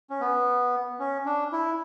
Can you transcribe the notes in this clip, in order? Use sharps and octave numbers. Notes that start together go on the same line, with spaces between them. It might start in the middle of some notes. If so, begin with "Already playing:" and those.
C#4
B3
C#4
D4
E4